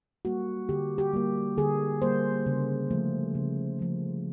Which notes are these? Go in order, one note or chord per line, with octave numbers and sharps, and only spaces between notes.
G3 A#3 F#4
D3 G4
G4
G3 A#3
D3 G#4
G3 A#3 C5
C#3
F3 A3
C#3
F3 A3